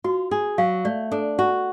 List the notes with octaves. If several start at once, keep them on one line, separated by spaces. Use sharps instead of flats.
F4 F#4
G#4
F#3 F5
A3 D5
D4 A4
F#4